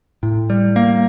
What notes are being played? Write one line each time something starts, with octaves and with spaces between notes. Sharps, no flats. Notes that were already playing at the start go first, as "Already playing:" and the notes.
A2
G3
A#3